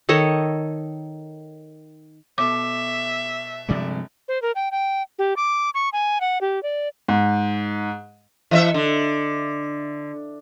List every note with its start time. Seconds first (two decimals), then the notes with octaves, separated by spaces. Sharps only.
0.09 D#3 A4 C#5 D#5
2.38 B2 A4 E5 D6
3.69 G1 C3 F3 G#3 D5
4.28 C5
4.42 A#4
4.55 G5
4.71 G5
5.19 G4
5.37 D6
5.74 C#6
5.93 G#5
6.21 F#5
6.41 G4
6.63 D5
7.08 G#2
8.51 E3 D#5 E5
8.74 D3